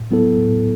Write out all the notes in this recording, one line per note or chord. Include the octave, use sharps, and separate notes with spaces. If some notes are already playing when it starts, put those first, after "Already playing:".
Already playing: A2
F#3 B3 E4 A4
A2